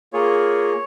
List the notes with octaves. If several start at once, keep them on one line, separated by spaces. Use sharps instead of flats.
A#3 F4 G#4 C#5